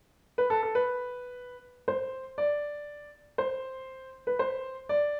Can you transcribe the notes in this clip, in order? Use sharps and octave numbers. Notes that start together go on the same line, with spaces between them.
B4
A4
A4
B4
C5
D5
C5
B4
C5
D5